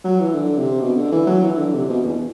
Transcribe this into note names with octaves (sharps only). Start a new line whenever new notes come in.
F#3
E3
D3
C3
B2
D3
E3
F#3
E3
D3
C3
B2
E2